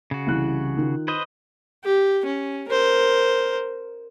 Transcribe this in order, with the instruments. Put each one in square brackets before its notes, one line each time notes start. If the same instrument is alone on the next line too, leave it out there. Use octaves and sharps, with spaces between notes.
[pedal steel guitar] C#3 F#4
[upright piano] C2 E3 F#6
D#3 F4
[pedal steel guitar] B4 C5 D#5
[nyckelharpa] G4
C#4
A#4 C5